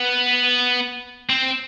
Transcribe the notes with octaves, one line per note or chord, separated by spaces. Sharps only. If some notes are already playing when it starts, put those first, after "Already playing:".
Already playing: B3
C4